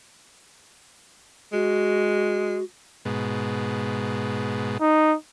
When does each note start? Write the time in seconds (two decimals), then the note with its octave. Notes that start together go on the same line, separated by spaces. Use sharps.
1.53 G#3 F#4
3.05 G#2 B2
4.81 D#4